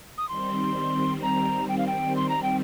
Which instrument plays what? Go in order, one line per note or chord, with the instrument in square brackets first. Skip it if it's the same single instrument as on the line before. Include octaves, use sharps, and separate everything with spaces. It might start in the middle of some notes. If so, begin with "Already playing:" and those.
[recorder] D#6
[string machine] D#3 G3 C4 [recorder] C6
[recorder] A#5
G5
F5
G5
C6
A#5
G5